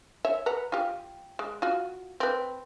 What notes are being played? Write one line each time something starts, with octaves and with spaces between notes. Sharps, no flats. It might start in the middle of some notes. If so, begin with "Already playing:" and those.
C#5 E5
B4 F#5 A#5
F4 G4
G#3
F4 F#4
C4 B4